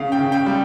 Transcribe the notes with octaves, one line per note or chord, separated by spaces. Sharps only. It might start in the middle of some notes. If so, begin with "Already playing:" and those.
Already playing: C#3 F5
G5
C#3
G5
G3